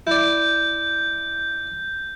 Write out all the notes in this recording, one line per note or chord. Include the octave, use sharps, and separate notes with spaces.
E4 D5 G6